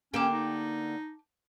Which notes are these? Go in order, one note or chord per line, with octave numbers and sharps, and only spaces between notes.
D3 A#3 C#4 G4 G5 A5 D6
D#4